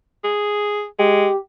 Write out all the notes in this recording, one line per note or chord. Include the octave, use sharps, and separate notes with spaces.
G#4
G#3 G4